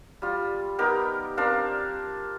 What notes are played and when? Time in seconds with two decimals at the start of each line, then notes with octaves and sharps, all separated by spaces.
0.22 G3 F4
0.79 B3 D#4 G4 A#4
1.37 C4 D4 A#4 F5